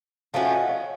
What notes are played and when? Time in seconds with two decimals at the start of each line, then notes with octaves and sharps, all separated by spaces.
0.33 F3 A3 C#4 F#4 F5 A5
0.51 D#5 F#5
0.69 C#5 F5